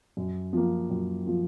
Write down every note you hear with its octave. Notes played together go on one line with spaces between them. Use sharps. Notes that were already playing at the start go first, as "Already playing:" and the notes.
F#2
F3 A#3
F#2
F3 A#3